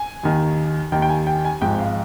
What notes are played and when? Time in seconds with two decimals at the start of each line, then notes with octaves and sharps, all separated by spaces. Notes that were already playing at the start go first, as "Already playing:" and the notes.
Already playing: G#5
0.23 D#2 D#3
0.92 D#2 D#3 G5
1.02 G5
1.09 G#5
1.27 G5
1.45 G#5
1.61 G#1 G#2 F3 G5
1.79 F5